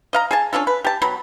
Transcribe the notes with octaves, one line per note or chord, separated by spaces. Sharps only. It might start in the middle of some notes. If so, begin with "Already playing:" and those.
D#5 F5 A#5
G#4 G#5 A5
C#4 D4 F4 A4
B4
G4 A5
B2 F#3 B5